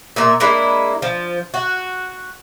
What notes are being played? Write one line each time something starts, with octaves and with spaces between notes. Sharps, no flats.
A#2 A#3 E5
G#3 A#3 D4 E4
F3
F#4